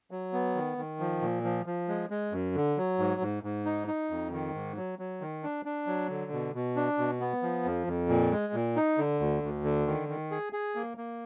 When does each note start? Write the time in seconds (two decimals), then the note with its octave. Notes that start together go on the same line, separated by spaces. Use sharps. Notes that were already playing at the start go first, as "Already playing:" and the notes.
0.11 F#3
0.33 B3
0.55 D#3
0.77 D#3
1.00 F3
1.21 A#2
1.44 F3
1.66 F3
1.89 G#3
2.10 G#3
2.32 F#2
2.55 D3
2.77 F#3
2.99 G#2
3.21 G#2
3.43 G#2
3.65 D#4
3.88 D#4
4.10 F2
4.32 D#3
4.54 G#2
4.77 F#3
4.99 F#3
5.21 D#3
5.43 D4
5.65 D4
5.87 F#3
6.09 D3
6.32 B2
6.54 B2
6.76 D4
6.98 B2
7.20 B3
7.42 F3
7.65 F2
7.87 F2
8.09 A#2
8.31 G#3
8.53 A#2
8.76 D#4
8.98 D3
9.20 D2
9.43 D2
9.64 D3
9.87 D#3
10.08 D#3
10.31 G#4
10.53 G#4
10.75 A#3
10.97 A#3